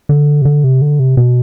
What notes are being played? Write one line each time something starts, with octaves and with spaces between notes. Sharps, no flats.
D3
C3
D3
C3
D3
C3
B2